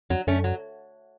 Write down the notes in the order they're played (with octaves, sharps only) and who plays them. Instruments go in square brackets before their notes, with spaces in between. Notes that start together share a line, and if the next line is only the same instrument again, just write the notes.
[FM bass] F2 [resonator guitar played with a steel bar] F#3
[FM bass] F#2 [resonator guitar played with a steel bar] A3 C#4
[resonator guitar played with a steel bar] F#3